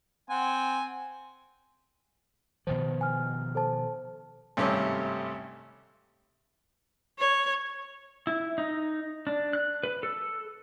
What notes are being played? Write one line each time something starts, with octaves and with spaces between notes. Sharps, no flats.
C4 F#5 G#5
B2 D#3 F3 C5
G#5 F6
A4 C5 A5
G#1 G2 C3 A3 C#4 G4
C#5
E4
D#4
D4
F#6
B4
A4